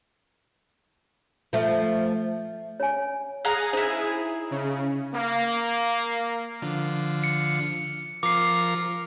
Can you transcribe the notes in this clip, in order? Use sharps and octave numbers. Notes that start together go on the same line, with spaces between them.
F3 A3
C#5 G#5
G#4 F5 F#5 A#5
D#4 E4 C5
C#3
A#3
D3 F3
C#7
F3 A#4 D6 C7